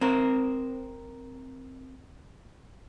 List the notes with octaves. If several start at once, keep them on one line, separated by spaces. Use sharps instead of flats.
C4 A#4